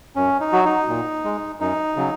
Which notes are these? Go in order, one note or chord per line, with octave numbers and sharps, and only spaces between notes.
F#2 C#4
D#4
F#3 F#4
D#4
A#2
G#3
F#2 D#4
C#3 F#3